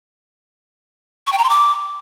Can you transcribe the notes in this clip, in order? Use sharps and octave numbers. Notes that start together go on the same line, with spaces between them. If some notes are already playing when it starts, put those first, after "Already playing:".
C#6
G5
A#5
C6
D6